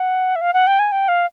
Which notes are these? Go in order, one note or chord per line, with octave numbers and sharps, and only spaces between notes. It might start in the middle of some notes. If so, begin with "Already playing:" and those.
Already playing: F#5
E5
F5
F#5
G5
G#5
G5
F5